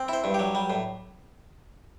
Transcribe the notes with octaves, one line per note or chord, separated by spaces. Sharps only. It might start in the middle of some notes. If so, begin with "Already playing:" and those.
Already playing: C4
E4 C5
G2
F#3 G4
G3
A2